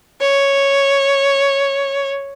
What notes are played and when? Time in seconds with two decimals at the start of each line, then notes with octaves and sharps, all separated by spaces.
0.21 C#5